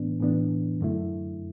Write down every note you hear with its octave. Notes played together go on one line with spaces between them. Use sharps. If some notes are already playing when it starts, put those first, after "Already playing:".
Already playing: A2 E3 B3 D4
A2 E3 B3 D4
F#2 D3 A3 E4